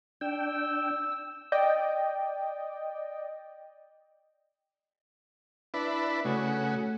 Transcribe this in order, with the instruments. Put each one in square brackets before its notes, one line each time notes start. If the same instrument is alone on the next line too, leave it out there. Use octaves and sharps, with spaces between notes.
[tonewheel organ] D4 G5 [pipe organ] E6
[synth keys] D5 D#5 G5
[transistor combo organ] D4 E4 B4
[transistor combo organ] C#3 F#4 [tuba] A3